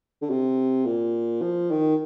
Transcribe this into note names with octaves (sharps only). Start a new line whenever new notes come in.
D3
C3
A#2
F3
D#3